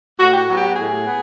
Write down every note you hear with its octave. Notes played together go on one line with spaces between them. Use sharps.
A2 F#4
G4
F#4
F#3 B3
G4
A2 G#4
B3